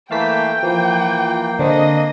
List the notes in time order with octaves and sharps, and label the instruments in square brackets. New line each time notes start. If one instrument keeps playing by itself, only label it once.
[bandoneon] E3 A3 [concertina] A#3 [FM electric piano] F5 A5 B6 [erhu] G5
[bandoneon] E3 [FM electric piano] F3 [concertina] A#3
[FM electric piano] D3 C4 [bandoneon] D4 [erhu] D#5